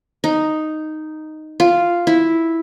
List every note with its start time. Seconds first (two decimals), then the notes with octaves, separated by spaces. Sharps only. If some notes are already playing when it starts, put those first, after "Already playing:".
0.24 D#4
1.60 F4
2.07 E4